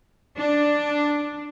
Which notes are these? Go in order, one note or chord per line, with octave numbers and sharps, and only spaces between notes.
D4